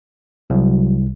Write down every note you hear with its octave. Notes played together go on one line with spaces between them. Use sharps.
C2 F#3